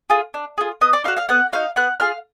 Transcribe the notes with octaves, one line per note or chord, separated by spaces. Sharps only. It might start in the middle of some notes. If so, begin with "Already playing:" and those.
F4 G#4
D4
F4 G#4
B3 D#5 D#6
D5 D6
D#4 F#4 F5 F6
F5 F6
B3 F#5 F#6
D#4 F#4 F5 F6
B3 F#5 F#6
F4 G#4 F5 F6